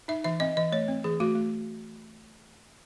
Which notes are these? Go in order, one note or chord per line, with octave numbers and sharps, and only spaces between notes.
D#4 E5
E3 E5
C4 D#5
E3 D#5
A3 C#5
C4
E3 G#4
A3 F#4
A3